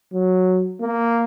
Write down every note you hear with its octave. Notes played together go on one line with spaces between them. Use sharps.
F#3
A#3